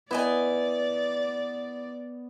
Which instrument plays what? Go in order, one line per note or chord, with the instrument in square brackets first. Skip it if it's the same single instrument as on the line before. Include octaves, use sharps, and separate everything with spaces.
[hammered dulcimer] B3 [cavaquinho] E4 D#5 G#5 [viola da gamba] D5